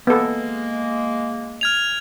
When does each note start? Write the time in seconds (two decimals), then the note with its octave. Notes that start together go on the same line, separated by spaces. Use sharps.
0.07 G#3 A#3 B3 A4
1.61 F6 G#6 F7